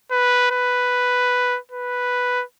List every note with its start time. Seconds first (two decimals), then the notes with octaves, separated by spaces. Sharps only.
0.11 B4
0.51 B4
1.72 B4